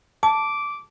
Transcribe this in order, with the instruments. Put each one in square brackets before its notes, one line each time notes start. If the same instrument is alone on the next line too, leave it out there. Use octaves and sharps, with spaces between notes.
[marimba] A5 [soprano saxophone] D6